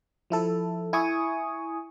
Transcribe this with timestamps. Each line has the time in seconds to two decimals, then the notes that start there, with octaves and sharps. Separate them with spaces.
0.30 F3 E4 A4
0.93 E4 G#5 C#6 D#6